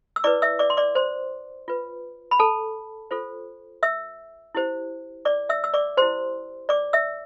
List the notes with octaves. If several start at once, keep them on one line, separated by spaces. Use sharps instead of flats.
E6
E4 B4 D5 D6
E5 E6
D5 D6
C6
D5 D6
C5 C6
F4 B4
B5
A4 A5
F4 A4 C5
E5 E6
E4 G4 C5
D5 D6
E5 E6
E6
D5 D6
E4 G4 C5 C6
D5 D6
E5 E6